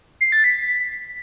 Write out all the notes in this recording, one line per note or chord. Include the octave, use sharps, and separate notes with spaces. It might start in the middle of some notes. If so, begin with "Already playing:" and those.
C7
A6
B6